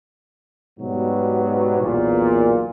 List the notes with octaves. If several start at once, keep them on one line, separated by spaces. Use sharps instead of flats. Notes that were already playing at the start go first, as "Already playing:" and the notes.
G#2 B2 F#3 G3 B3
B1 E2 A#2